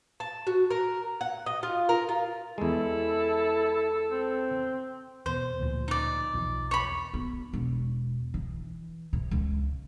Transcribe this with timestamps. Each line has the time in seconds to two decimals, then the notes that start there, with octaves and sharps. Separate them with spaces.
0.20 A5
0.47 F#4
0.70 A#4
1.21 F#5
1.46 D#5
1.63 F4
1.89 A#4
2.09 F4
2.58 E2 G#3 E4 A4
4.10 C4
5.26 E2 B2 C5
5.60 D2 A#2 F3
5.88 D#4 D5
6.34 B1 E2 F3
6.71 C#5 B5
7.14 B3
7.53 E1
8.34 E3
9.13 C3
9.31 C#2